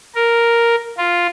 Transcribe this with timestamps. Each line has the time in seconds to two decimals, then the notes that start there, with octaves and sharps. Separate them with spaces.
0.15 A#4
0.98 F4